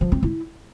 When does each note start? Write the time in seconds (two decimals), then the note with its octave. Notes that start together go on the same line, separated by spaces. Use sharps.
0.01 F3
0.12 C4
0.23 E4